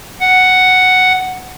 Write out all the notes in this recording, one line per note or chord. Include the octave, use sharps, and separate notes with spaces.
F#5